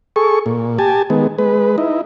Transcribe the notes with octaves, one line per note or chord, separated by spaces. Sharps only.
G#4 A4 C#6
A#2
G4 G#5 A5
D#3 G#3 B3
G#3 B4
D#4 E4